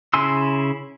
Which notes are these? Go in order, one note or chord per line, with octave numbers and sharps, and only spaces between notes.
C#3 E4 G#5 C6 E6